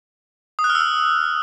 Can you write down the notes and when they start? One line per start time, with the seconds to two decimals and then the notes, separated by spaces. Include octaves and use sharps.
0.59 D#6
0.64 F#6
0.70 F6
0.75 E6
0.81 F6